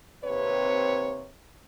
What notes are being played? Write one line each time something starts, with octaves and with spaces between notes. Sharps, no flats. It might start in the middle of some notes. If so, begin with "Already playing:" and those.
D#2 C3 C4 B4 C#5